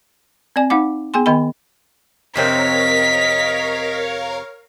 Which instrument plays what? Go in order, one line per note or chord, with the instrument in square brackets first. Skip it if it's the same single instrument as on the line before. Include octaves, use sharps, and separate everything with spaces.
[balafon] C4 D5 G#5
D#4 F5 F#5 D6
B3 G#4 G5 G#5 C6
D#3 B3 D#5 G5 B5
[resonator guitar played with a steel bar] F2 C3 C4 [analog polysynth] A#4 C#5 F5 [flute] D#5 [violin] B6